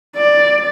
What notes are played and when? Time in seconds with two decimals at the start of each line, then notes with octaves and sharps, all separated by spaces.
0.17 D5